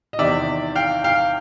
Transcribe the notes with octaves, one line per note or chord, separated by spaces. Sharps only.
D#5
E2 C3 D#3 D5 E5
F5 G5
F5 G5